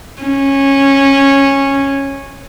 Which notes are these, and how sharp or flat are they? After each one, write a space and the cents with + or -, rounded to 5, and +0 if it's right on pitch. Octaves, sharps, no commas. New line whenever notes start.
C#4 -15